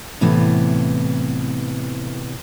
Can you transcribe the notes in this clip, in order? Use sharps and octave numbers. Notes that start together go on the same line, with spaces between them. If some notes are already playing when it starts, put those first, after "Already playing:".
A2 C3 E3 B3